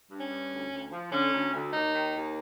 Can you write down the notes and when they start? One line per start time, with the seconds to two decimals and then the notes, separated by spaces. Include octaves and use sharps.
0.10 G2
0.20 C#4
0.30 G2
0.51 D2
0.71 D2
0.92 F3
1.11 D3 C#4
1.33 D2
1.53 D2
1.73 D#2 D#4
1.94 D#3
2.14 D#2